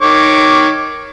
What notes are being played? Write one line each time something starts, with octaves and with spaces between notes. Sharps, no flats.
D#3 C#5 D6